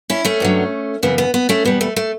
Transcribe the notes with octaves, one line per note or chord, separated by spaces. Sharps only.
C#4 E4
A3 C#4
G2 D3 F#3
F#2 C#3 E3 B3
B3
B3
A3 C#4
E2 B2 G3 B3
A3
A3